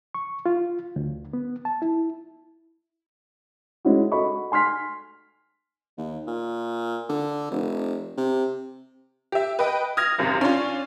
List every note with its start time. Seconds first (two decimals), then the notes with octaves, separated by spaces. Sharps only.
0.15 C#6
0.46 F4
0.96 D2
1.33 B3
1.65 A5
1.82 E4
3.85 G#3 C#4 E4 F#4
4.12 F#4 A4 D#5 B5 C#6
4.52 G#5 C6 F6 B6
5.98 D#2
6.27 A#2
7.09 D3
7.52 F1
8.18 C3
9.32 G4 E5
9.59 B4 D#5 G5
9.97 D#6 F6 G#6 A#6
10.18 G#1 F#2 C3
10.41 C#4 D4 F4